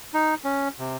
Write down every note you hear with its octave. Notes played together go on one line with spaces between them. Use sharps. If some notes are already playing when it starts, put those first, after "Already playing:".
D#4
C#4
C3